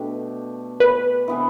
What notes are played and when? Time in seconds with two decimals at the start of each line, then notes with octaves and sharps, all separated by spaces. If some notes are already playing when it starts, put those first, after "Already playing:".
Already playing: B2 A3 D4 G4
0.80 B4
1.28 C3 E3 B3 E4